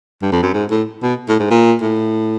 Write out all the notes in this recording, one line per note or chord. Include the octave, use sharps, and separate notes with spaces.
G2
F2
F#2
G#2
A2
B2
A2
G#2
A#2
A2